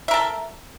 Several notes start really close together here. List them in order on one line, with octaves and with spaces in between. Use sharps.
E5 A#4 A4